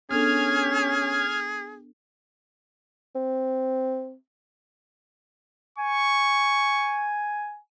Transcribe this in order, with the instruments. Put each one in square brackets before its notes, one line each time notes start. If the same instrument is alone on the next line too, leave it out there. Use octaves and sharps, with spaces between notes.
[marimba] B3 D4 A4 [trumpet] C#4 [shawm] G#4 [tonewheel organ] F6 G#6
[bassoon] C4
[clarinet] G#5 [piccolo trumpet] C#6